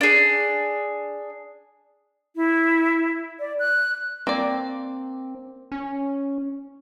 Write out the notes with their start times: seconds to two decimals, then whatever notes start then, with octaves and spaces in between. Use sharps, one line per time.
0.01 D4 G#4
2.36 E4
3.40 D5
3.59 F#6
4.27 A#3 C4 D5
5.72 C#4